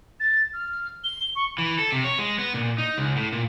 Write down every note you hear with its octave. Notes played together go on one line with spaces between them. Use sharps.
A6
F6
G7
C#6
E3
A4
C3
C#5
G#3
B3
A#2
D#4
C#2
A2
A#2